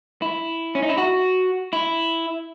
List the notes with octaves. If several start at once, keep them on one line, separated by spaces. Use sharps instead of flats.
E4
C#4
D#4
E4
F#4
E4